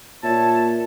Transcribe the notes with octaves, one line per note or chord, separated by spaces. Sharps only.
A#2 C#5 E5 A5